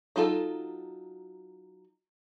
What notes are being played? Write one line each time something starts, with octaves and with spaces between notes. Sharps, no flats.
F#3 D#4 F4 A4